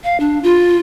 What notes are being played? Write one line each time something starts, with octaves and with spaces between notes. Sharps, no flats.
F5
D4
F4